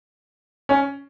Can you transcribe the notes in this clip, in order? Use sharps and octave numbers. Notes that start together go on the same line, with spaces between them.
C#4